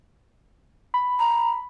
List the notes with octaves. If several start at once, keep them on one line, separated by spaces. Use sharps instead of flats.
B5
A#5